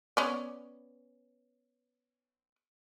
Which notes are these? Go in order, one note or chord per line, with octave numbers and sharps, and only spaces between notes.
B3 C#4 D5